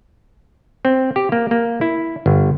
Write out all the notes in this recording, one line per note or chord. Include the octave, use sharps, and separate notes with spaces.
C4
G4
A#3
A#3
E4
G1